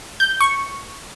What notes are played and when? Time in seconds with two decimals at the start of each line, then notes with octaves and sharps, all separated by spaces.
0.20 G6
0.40 C#6